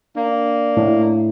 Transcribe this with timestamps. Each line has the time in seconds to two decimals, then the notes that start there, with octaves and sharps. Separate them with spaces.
0.16 A#3 D4
0.77 A2